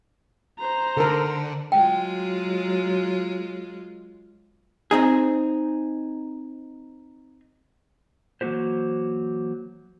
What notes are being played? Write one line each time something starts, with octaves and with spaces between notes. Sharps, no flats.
C5 A#5
D3 A4 A#4
F#3 G#3 F4 G5
C4 D#4 G#4
E3 F#3 A#3 F#4 G4 C5